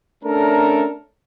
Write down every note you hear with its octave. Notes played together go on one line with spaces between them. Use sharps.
A3 C#4 D4 A4 A#4